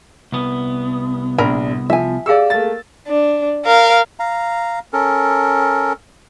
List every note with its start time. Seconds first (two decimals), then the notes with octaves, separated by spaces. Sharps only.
0.32 C2 B3
1.38 A#1 D4 A#4 B5
1.90 F3 E5 G#5
2.26 G4 G#4 D5 F5 E6
2.50 A3 A#3 A6
3.08 D4
3.65 A#4 F5
4.20 F5 A#5
4.93 C#4 A4 A#4